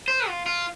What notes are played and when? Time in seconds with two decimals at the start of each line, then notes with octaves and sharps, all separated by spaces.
0.08 C5
0.28 F4
0.46 F4